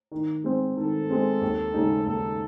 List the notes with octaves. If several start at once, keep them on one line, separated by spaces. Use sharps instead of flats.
D#3
G#3 C4
D#3 A4
G#3 C4
D#2
C#3 G#3 D#4
D#2 A4